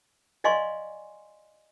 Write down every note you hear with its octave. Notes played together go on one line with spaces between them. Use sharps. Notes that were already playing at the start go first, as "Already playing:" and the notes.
D5 D#5 F5 G#5 C6 C#6